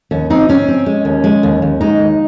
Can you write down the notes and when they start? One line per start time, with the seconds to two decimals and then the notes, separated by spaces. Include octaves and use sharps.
0.11 D#2 C#4
0.30 C4 D#4
0.49 C4 C#4
0.68 C4
0.86 G#3
1.05 D#2
1.24 G#3
1.43 D#2
1.62 D#2
1.81 G#3 D#4
1.99 D#2